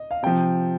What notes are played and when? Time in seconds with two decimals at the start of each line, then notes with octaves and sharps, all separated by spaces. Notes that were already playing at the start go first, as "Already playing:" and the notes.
Already playing: D#5
0.11 F5
0.23 C3 F3 G5